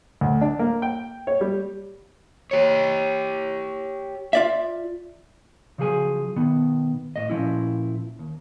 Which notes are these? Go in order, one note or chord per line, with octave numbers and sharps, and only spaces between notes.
D2
D4
A#3
G5
C#5
G3
G4 C#5
F4 D5 E5
C#3 F3 F#3 G#4 G#5
B2 D#3 B3
A2 D#5
A#2 F3 C#4 E4
D#2